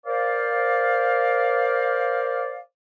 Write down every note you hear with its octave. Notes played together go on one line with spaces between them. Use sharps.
A#4 C5 D5 F5